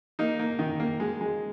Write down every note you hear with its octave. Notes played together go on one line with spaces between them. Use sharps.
A#3 D#4
A#3
D#3
A#3
G#3
G#3